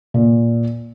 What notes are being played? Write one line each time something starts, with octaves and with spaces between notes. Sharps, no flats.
A#2